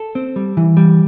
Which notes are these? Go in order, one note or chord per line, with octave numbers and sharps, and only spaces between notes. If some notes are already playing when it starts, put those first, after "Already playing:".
Already playing: A4
C4
G3
E3
G3